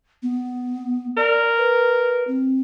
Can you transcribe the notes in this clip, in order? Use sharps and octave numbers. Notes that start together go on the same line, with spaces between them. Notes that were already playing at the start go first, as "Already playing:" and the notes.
B3
A#4 D5
B4
C4